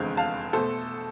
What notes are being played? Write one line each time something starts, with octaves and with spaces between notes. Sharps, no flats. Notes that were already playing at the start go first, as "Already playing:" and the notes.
Already playing: F1 E2 D3 G#3 C4 F5
F5 A5
B2 A3 A4 C5